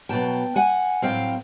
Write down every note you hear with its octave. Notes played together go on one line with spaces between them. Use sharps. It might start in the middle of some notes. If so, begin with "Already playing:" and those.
E2 B2 F#3 G5 A5
F#5 G#5
A2 F#3 A3 C4 F5 G5